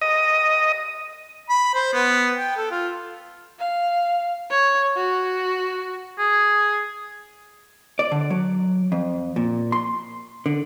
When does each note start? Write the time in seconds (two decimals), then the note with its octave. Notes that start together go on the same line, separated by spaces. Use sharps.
0.01 D#5
1.49 B5
1.75 C5
1.94 B3
2.37 G5
2.57 A4
2.71 F4
3.59 F5
4.51 C#5
4.97 F#4
6.19 G#4
7.99 D5
8.12 D3
8.30 F#3
8.92 F2
9.36 A#2
9.72 C6
10.46 D3